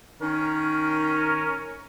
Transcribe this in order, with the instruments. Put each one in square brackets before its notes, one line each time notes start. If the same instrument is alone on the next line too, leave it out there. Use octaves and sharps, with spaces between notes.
[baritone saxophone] D#3 [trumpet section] C#4 A#4